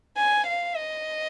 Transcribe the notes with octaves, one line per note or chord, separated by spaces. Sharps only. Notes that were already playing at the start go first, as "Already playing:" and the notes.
G#5
F5
D#5